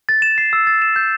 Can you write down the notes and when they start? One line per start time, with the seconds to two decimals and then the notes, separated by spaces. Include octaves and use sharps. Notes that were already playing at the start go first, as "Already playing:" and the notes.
0.09 A6
0.22 E7
0.38 C7
0.53 E6
0.67 A6
0.82 E7
0.96 G6